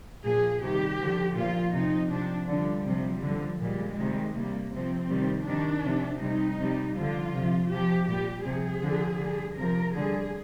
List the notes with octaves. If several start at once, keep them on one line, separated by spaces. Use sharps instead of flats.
A#2 F3 G#4
C3 D#3 G3 G4
D3 F3
A#2 F3 F4
C3 F3 D#4
C3 F3 D4
D3 F3 G3
C3 F3
D3 F3
A#2 G3 G#3
C3 D#3 G3
C3 G3 A#3
C3 F3 C4
C3 D#3 G3
C3 D#3 G3 D4
C3 F3
C3 G3 D#4
C3 G3
D3 F3 F4
C3 F3
C3 F3 G4
A#2 G3 G4
C3 F3 G#4
D3 F3
D3 G3
C3 F3 A#4
D3 G3 G#4